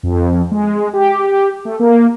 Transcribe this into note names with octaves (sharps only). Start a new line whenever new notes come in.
F2
G#3
G4
A3
A#3